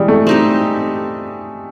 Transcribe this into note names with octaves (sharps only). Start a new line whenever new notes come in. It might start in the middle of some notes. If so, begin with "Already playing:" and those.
Already playing: E3 G3 G#3
A3
C4 D#4 G4